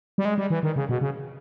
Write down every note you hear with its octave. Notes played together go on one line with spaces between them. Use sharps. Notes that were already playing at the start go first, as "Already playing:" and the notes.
G3
G#3
G3
E3
D#3
C#3
B2
C#3